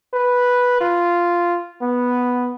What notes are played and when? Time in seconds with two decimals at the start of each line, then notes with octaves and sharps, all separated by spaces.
0.14 B4
0.81 F4
1.82 B3